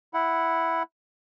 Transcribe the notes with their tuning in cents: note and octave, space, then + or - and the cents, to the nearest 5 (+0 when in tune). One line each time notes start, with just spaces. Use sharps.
E4 +0 F#5 +0